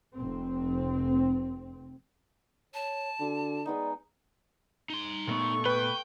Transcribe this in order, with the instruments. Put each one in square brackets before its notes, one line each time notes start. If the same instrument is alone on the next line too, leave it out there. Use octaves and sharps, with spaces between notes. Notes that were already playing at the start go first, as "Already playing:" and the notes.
[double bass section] F1 C4
[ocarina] C#5 [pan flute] A5
[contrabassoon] D3 [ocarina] F#4
[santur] G#3 B3 D#4 [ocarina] D5
[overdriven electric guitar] D#4 C6
[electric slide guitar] A#2 A3 B3 [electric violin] A4 C#6
[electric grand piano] B4 [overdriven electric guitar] G5